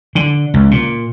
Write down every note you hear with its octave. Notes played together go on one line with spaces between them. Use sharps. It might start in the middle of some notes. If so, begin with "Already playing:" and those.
D3
C#2
A#2